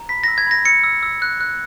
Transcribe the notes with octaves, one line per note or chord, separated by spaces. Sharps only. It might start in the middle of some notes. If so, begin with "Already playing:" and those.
Already playing: A#5
B5 B6
E6 A#6
G#6
B5 A#6
E6 C#7
E6
E6
F#6
F#6